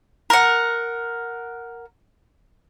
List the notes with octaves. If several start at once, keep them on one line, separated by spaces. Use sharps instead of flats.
A#4 F#5